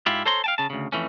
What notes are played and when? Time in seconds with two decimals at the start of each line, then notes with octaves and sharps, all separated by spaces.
0.06 G#2 E4 F4 G4
0.26 A4 C5 C#5 A#5 C6
0.44 F5 G5 A5
0.58 C#3 A5
0.70 D2 C#3
0.92 F2 E3 A3 C#4